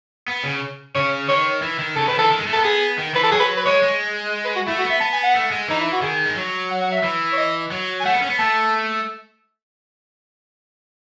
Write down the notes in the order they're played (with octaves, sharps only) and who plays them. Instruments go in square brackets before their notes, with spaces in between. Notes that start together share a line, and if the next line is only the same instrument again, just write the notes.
[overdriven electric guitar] B3
C#3
[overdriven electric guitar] C#3 [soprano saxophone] C#5
[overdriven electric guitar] D#3 [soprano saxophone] C#5
[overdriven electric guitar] E3
D#3
[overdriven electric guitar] C#3 [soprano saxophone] A4
[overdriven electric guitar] D#3 [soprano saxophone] B4
[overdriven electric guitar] E3 [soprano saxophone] A4
[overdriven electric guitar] D#3
G#3
A3
[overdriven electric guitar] B3 [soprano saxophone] A4
[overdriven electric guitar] B3 [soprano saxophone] G#4
[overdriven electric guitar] D#3
[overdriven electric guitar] E3 [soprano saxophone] B4
[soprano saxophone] A4
[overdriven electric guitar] F#3 [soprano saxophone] G#4
[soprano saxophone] B4
B4
[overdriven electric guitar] G#3 [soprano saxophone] C#5
[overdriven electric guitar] G#3
[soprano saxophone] B4
F#4
[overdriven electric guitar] A3 [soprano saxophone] E4
[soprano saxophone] F#4
[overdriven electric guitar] B3
[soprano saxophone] E5
[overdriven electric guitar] B3 [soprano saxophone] A5
[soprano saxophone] G#5
F#5
[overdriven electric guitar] A3
G#3
[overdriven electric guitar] E3 [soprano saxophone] D#4
[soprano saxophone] E4
F#4
[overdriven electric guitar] D#3 [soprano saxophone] G#4
[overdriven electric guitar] G#3
F#3
[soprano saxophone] F#5
F#5
E5
[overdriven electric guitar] E3
[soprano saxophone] C#5
D#5
[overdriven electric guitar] F#3
[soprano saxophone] G#5
[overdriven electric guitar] A3 [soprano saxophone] F#5
[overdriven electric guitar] B3
C#4
B3
[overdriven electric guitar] A3 [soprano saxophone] A5